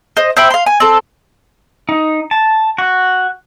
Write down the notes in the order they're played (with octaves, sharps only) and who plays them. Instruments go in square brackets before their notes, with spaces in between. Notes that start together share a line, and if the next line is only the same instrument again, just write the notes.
[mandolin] C5 D#5
C5 E5 G5 B5
F5 C6
G#5
C4 A4
[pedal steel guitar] D#4
A5
F#4